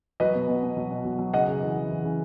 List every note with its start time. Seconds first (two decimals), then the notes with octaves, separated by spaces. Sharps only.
0.20 F#3 B4 D#5
0.35 B2
0.48 B2
0.63 B2
0.77 F#3
0.91 B2
1.05 F#3
1.19 F#3
1.34 C#3 D#5 F#5
1.48 C#3
1.62 E3
1.76 E3
1.91 E3
2.04 C#3